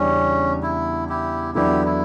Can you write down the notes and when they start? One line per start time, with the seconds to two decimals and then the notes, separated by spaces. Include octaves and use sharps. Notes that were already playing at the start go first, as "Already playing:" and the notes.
Already playing: E2 C#3 G3 C#4 D4
0.63 E4
1.09 E4 G4
1.55 E2 D3 F#3 B3 D4 E4 G4
1.85 E4